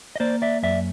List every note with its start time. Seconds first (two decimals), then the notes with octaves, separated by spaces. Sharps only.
0.16 D#5
0.20 A#3 C5 D5
0.42 D5 E5
0.63 F#2 D5 E5